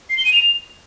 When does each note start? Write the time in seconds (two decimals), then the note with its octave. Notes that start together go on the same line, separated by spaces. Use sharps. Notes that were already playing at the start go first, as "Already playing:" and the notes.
0.10 C7
0.17 G7
0.25 D#7
0.33 F7